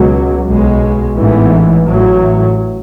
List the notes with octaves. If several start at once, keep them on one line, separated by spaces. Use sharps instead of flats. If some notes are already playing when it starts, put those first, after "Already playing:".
Already playing: C#2 B2 F#3
B1 B2 G#3
A1 G#2 E3 B3
A1 A2 F#3